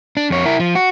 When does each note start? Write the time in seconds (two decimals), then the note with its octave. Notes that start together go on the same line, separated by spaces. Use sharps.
0.17 D4
0.30 F2 C#5
0.46 E4 A#4
0.60 F3
0.75 F#4